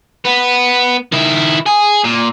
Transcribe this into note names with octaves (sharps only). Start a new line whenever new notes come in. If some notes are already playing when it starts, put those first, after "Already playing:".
B3
D#3 E4
G#4
A#2